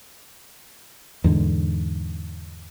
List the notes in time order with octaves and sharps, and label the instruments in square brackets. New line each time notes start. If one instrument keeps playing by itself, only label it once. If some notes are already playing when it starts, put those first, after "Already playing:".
[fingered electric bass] E2 G#2 D3